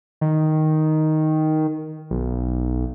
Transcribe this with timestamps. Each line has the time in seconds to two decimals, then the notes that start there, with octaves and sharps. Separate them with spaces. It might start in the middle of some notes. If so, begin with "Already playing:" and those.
0.21 D#3
2.11 B1